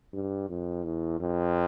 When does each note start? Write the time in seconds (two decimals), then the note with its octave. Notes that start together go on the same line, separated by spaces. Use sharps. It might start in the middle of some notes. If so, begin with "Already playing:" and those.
0.13 G2
0.49 F2
0.84 E2
1.20 F2